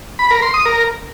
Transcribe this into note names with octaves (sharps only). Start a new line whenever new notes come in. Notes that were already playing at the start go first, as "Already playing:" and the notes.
B5
A#4
C6
D#6
A#4